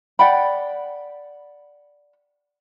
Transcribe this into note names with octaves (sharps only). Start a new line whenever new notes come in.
D5 F#5 G5 B5